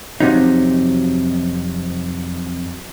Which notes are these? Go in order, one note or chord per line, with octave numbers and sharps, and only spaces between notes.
F2 C3 F#3 D#4